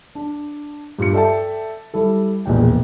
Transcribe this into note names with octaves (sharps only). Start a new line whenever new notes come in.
D4
G2 F4 C#7
A4 D5 E5 G5 A5
G3 E4 A4
E1 A#1 E2 A#2 G5